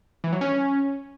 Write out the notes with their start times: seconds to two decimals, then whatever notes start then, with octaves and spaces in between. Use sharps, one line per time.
0.24 E3
0.32 F#3
0.41 C#4